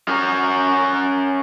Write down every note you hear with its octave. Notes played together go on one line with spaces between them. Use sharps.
C#4 A#4